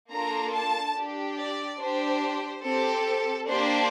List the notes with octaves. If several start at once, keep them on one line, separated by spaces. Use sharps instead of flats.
A#3 D4 F4 A4 A#5
A5
D4 G4
D5
D4 G4 C5
C4 G4 A4
A#3 D4 G4 C5